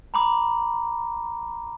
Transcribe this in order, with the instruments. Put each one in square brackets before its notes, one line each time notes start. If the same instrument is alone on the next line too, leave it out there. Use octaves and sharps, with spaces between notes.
[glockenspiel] A#5 B5 D6